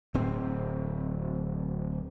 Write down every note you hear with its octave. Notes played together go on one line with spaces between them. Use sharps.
D1 C4